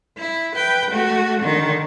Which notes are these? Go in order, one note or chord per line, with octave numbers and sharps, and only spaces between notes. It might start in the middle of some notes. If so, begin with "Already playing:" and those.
E4
B4 G5
A3 F#4
D3 D#3